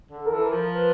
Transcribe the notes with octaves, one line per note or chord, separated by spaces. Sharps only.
D3
A4
A#4
E3 A4
A#4
F3
B4